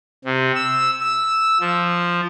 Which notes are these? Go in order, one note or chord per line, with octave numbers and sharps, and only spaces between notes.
C3
E6
E6
F3